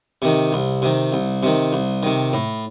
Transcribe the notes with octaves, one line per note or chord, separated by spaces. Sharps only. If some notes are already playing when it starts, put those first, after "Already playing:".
C3 D#3
C2
C3 D#3
C2
C3 D#3
C2
C3 D#3
A2